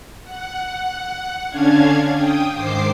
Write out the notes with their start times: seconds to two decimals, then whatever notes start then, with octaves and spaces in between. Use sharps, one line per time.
0.23 F#5
1.48 D3 C#4 D4 F5 G#6
2.12 G5 D#6
2.54 G#2 D#3 C5 D6 C7